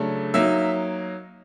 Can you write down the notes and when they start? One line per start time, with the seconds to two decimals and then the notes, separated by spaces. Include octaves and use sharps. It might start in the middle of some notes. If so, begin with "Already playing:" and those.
Already playing: C#3 F#3 A3 D4
0.34 F#3 A#3 D#4 E5